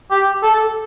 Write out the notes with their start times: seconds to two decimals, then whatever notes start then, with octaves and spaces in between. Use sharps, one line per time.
0.11 G4
0.43 A4